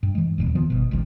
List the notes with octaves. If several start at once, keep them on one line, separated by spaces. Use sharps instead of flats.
G2
E3 G#3
D#1 A#1 E2
D#3 F3 B3
G1 B2
G#1 C#2 C3 F3